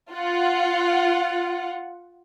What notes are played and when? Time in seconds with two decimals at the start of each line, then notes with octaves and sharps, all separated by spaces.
0.12 F4 F#5